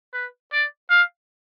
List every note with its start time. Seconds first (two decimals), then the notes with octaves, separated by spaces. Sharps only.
0.14 B4
0.52 D5
0.90 F5